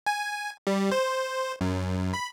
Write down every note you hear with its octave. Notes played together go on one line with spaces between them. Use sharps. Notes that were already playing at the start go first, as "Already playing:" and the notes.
G#5
G3
C5
F#2
B5